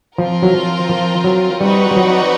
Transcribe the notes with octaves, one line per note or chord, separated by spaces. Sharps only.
F3 C4 F4 A#4
F#3
F3
F3
F#3
G3 C4 D#4 F#4 B4 D5
G3
F#3